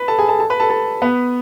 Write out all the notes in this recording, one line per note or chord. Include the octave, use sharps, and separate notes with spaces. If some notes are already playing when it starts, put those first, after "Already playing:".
Already playing: B4 B5
A4 A5
G#4 G#5
A4 A5
A4 A5
B4 B5
A4 A5
A4 A5
B3 B4